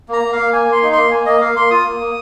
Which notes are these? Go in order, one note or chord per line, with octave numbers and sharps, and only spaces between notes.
A#3 A#5
A#3
F5
A#3
A#3 G#5
A#3 C6
D#4
A#3 C6
A#3 G#5
A#3 D#5
A#3 F5
A#3 C6
F4 D#6
A#3
A#3